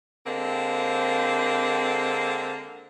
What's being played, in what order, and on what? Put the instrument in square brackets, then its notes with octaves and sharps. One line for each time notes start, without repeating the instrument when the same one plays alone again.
[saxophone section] D3 G#3 A#3 C4